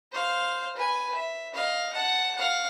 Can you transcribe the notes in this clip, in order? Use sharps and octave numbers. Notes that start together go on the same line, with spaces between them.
C5 F5
B4 G#5
E5
D#5 F5
F#5 A5
F5 F#5